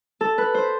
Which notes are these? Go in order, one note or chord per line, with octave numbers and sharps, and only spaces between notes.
A4
B4
C5